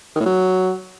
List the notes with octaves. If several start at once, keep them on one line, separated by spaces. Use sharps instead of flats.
D#3
A2
F#3